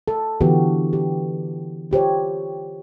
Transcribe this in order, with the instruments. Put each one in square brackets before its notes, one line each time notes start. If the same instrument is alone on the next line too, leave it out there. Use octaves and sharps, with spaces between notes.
[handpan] A4
D3 E3 B3 F#4 G4 A4
G4
F4 G4 C5 C#5